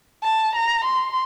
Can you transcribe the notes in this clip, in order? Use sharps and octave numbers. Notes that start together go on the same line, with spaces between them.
A5
A#5
C6